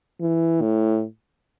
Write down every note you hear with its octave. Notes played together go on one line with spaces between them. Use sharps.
E3
A2